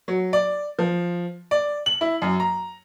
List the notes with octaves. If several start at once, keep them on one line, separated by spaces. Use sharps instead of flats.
F#3
D5
F3
D5
F#7
E4
F#2
A#5